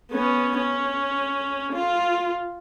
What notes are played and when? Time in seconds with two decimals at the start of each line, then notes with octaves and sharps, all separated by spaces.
0.12 B3 C#4
0.57 C#4
1.73 F4